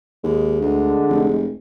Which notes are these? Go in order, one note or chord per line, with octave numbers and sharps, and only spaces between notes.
D#2 G#3
D2 D3
F1